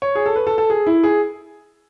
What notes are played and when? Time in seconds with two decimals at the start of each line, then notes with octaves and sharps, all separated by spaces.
0.02 C#5
0.15 G#4
0.26 A4
0.36 B4
0.47 A4
0.58 A4
0.70 G#4
0.87 E4
1.03 G#4